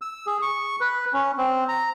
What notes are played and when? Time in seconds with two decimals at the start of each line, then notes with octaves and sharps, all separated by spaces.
0.01 E6
0.27 G#4
0.42 C#6
0.81 B4
1.13 C#4
1.38 C4
1.68 A#5